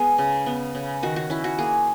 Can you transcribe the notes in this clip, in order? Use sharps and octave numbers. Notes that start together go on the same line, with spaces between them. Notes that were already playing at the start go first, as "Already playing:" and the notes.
Already playing: G#3 B3 G#4
C#3
B3
C#3
D#3 F#4
F#4
C#4 E4
F#4
A#3 G#4